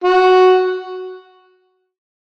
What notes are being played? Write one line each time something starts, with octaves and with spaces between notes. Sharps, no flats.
F#4